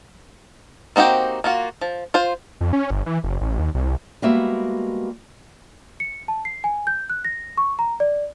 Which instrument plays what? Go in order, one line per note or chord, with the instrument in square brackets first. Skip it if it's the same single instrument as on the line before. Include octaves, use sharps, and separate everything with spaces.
[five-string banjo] A#3 C4 D#4 F#4 G4
A#3 F4 F#4
F3
F4 C5
[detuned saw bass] F2
C#4
G1
E3
F#1
A1
D#2
C2
[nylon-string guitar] G3 G#3 A#3 B3 F#4 E5
[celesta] C#7
A5
C7
G#5
G6
F#6
A#6
C#6
A#5
D5